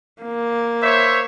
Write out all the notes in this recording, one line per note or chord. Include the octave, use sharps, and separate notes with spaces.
A#3
C5 C#5 E5